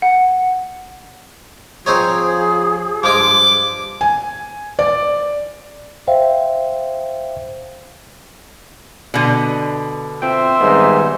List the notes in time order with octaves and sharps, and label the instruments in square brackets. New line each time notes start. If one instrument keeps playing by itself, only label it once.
[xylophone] F#5
[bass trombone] F3 [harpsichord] C4 D#4 C#5 [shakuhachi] G#4
[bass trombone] G2 [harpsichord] F3 G#3 [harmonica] D6
[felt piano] G#5
D5
[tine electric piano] C5 E5 F5 G5
[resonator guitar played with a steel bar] B2 D3
[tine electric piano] C4 F4 G5 [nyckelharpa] C5 E5
[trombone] G#2 [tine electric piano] D#3 G3 B3